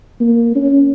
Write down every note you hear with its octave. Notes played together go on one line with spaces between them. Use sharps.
A#3
C#4